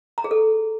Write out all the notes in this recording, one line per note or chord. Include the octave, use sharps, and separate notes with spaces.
A#5
G#4
A4